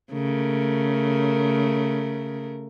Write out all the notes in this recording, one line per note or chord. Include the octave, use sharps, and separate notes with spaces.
C#3 A3 A#4